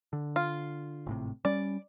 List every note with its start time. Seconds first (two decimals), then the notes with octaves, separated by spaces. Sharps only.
0.13 D3
0.36 F4
1.06 G#1 A2 C3
1.45 G3 C#4 D5